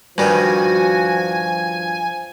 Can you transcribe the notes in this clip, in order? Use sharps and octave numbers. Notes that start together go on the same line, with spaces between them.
G2 D#3 F3 F#4 G#5